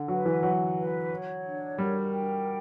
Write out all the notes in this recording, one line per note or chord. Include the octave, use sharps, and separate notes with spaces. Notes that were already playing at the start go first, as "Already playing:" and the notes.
Already playing: D3
F#3 B4
E3
F#3 F#5
B4
C#5
D4
G3 A#4
G5